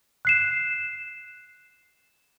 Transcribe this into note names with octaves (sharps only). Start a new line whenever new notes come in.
F#6 C7 E7